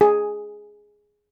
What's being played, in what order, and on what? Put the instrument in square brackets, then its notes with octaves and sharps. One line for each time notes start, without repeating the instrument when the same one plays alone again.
[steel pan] G#4